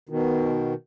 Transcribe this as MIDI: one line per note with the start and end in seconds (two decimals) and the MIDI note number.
0.09 0.74 47
0.09 0.74 51